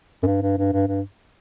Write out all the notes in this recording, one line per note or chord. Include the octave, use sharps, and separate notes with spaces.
F#2
G2
G2
G2
G2
G2